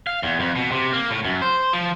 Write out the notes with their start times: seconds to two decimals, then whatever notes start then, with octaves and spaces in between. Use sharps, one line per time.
0.07 F5
0.23 E2
0.40 F2
0.56 B2
0.71 C3
0.93 A#3
1.10 A2
1.25 F#2
1.42 C5
1.73 F3